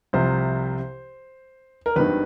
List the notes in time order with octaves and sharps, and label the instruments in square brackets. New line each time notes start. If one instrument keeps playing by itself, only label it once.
[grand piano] C2 C3 F3 C5
A#4
G#1 G2 D#3 B4